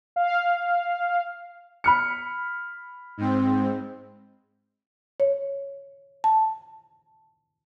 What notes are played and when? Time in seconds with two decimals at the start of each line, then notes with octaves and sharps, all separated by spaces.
0.16 F5
1.84 B5 F6 C#7
3.17 G#2 C4
5.20 C#5
6.24 A5